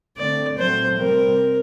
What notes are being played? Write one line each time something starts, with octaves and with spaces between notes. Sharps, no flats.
D3 A3 C4 D5
A#2 F#3 A3 C4 C5
C3 G3 C4 A#4